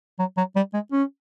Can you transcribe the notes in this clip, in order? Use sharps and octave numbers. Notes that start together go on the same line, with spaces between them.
F#3
F#3
G3
G#3
C#4